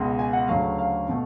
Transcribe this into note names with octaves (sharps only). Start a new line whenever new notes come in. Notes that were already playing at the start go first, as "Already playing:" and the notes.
Already playing: C#2 B2 G#3
G#5
F#5
D2 C#3 F#3 A3 F5
F5
B2 A3